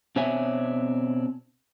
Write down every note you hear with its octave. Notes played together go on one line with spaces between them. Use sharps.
B2 C4 D4 C#5 E5 G#5